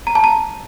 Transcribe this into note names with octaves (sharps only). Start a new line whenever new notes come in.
A#5
A5
A#5